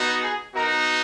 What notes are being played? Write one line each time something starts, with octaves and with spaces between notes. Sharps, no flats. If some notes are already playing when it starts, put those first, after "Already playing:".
Already playing: B3 D#4 F#4
G#4
B3 D#4 F#4 A#4